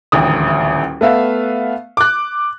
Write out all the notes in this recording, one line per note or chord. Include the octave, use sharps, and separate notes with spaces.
D#1 A1 D2 D#6
A3 B3 E5 F5
D6 F#6